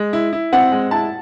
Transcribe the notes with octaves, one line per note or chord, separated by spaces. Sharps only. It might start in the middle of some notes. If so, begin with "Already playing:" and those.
Already playing: G#3
E4
E4
C4 F#5
G#3
E4 A5